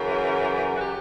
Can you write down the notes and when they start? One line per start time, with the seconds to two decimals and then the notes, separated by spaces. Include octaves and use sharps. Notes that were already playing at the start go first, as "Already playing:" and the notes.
Already playing: F#2 C#3 E3
0.76 F#4
0.80 G4